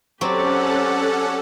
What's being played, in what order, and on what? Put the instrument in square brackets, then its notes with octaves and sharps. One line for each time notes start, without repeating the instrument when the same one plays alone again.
[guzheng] F#3 C4 [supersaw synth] C#4 A4 F#5 [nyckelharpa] G4 D5